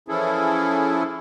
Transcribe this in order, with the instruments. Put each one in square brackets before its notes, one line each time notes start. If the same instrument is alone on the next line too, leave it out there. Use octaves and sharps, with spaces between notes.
[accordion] E3 F3 C#4 E4 G#4 A4